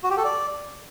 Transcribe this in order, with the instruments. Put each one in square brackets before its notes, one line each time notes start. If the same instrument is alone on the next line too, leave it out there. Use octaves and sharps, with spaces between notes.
[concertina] F#4
G4
A4
D5